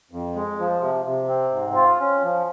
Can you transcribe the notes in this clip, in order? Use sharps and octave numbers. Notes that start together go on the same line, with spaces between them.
F2
G#3
F3
C3
C3
C4
G#2
F4
C#4
F3